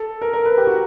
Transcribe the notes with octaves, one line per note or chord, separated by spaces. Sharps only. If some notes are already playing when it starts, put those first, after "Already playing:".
Already playing: A4
A#4
A#4
B4
G4
F#4